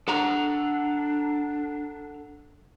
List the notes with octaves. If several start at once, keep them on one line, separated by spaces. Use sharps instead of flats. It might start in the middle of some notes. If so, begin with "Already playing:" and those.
D4 A4 F#5 A#5